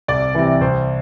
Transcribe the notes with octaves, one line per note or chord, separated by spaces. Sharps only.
C2 D5
C3 E3
C2 C5